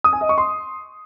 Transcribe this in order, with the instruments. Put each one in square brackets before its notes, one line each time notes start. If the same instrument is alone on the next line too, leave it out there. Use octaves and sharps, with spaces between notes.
[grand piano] D#6
G#5
D#5
C#6
C6